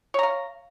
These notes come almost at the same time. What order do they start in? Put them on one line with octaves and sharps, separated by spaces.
C#5 A#5 F5